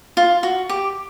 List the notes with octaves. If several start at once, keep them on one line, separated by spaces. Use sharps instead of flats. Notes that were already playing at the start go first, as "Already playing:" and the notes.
F4
F#4
G4